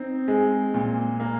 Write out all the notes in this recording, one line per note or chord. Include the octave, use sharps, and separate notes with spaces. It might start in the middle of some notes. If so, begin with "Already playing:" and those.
Already playing: C4 D#4
G#3
A#2
A#3